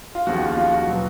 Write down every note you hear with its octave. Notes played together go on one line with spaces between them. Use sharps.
F4
D#2 C#3 F3 F#4
F4
F4
F#4
B2 F#3